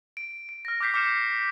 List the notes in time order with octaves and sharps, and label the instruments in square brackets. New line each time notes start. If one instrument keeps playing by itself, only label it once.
[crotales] D7
D7
F6 A#6
D6 F6 G6 B6 C7
D6 F6 C7 C#7 E7